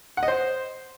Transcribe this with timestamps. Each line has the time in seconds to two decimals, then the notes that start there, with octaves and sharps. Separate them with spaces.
0.17 F#5
0.23 D#5
0.28 C5